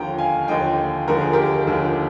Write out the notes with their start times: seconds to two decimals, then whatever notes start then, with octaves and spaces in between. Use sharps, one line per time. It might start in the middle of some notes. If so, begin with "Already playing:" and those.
Already playing: D#2 D3 F3 G5 A#5
0.18 F5 G#5
0.48 D#2 D3 F3 D#5 G5
1.08 D#2 D3 F3 A#4
1.21 G#4
1.33 G4 A#4
1.67 D#2 D3 F3